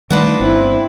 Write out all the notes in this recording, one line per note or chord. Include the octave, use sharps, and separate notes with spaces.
D#3 G3 A3 D4 D#4 F4 B4 F#5
G1 C4 E4